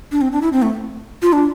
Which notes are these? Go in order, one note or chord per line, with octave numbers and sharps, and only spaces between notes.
D4
C4
D4
E4
C4
A3
F4
D4